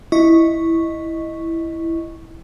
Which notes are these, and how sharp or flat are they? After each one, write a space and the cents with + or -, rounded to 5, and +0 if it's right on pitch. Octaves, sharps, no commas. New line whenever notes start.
E4 +0 D#5 +0 C#6 -5